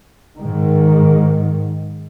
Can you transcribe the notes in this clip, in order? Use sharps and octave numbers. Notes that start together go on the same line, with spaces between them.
G#2 D#3